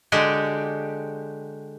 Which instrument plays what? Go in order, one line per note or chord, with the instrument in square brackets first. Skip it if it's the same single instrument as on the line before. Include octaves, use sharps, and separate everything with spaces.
[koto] D3 G#3 F#4 G4